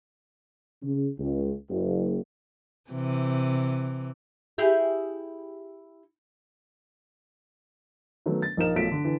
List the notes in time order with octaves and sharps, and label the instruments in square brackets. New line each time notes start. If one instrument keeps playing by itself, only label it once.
[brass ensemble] C#3
C#2
F#1
[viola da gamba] C3 E3
[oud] E4 G4 G#4
[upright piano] D#3 F#3 A3 B3
A6
A#1 A#3 D#4 A#4 E7
B1 F3 F#3 A3 B6 D7
D3
D3 E3